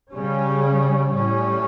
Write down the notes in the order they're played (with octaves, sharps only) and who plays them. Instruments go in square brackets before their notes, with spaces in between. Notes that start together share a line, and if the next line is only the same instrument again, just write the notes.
[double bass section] C#3 G3 C#4
A2 G3 C#4